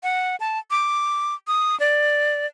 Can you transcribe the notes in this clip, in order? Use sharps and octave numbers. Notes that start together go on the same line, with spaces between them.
F#5
A5
D6
D#6
D5